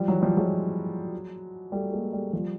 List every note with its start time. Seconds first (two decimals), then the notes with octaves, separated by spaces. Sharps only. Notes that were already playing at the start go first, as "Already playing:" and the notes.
Already playing: F3 G3
0.08 E3 F#3
0.22 F3 G3
0.37 F#3 G#3
1.72 G3 A3
1.92 G#3 A#3
2.12 G3 A3
2.33 F3 G3